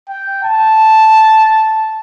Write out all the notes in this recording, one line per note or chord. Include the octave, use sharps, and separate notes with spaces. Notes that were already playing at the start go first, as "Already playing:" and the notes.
G5
A5